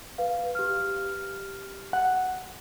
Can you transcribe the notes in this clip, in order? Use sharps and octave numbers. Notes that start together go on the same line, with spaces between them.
B4 F5
G4 F6
F#5